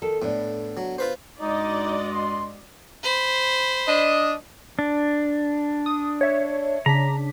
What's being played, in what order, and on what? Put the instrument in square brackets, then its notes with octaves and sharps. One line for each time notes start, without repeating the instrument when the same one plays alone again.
[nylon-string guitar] D#3 A4
[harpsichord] A2 [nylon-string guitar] B3 D4
[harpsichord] F#3
F4 B4 C5
[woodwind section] G2 G#3 [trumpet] D#4 [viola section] F#4 D5 D#5
[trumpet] C6
[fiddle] C5 B5
[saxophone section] D4 D#5
[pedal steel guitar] D4
[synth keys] D#6
C#5 E5
[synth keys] C#3 D4 B6 [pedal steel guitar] A#5